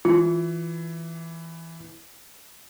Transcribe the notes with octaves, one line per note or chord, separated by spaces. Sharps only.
E3 F4